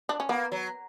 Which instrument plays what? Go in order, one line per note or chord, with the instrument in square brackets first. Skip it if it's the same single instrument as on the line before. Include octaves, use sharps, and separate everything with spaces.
[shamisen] D4
C#4
[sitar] A#3 [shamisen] B3
[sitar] F#3